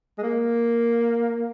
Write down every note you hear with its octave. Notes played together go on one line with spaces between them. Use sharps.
G#3
A#3